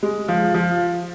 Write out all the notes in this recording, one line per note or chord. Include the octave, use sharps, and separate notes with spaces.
G#3
F3
F3